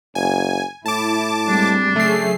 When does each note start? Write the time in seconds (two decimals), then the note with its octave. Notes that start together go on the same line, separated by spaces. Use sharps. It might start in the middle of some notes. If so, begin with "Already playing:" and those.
0.15 F#1 G#5
0.86 A2 E4 A5 D6
1.47 G3 G#3 C4 D4
1.96 C#3 F#3 A3 G#4 C7